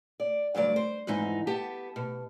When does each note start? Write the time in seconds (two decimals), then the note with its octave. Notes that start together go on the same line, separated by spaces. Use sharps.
0.20 D5
0.55 D2 G2 F#3 D5
0.76 C5
1.07 F2 G#2 E3 D#4
1.47 B3 G4 A5
1.96 B2